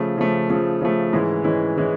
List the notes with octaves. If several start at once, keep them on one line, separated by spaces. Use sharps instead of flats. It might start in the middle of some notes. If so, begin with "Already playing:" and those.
Already playing: C#3 F3 A3
C#3 F3 A3
C#3 F3 A3
C#3 F3 A3
G#2 E3 G#3 C#4 E4
G#2 E3 G#3 C#4 E4
E3 G#3 C#4 E4